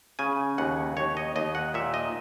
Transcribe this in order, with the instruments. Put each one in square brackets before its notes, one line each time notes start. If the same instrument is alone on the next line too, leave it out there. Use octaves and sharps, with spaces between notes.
[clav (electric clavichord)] C#3 G#5
D#2 F#5
D#2 C#5
D#5
D#2 D#5
F#5
A#2 E5
D#5